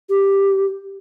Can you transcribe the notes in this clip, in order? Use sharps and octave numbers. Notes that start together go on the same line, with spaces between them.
G4